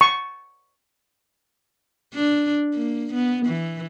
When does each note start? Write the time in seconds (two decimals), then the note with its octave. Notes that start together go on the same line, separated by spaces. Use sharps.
0.01 C#6
2.14 D4
2.74 A#3
3.14 B3
3.46 E3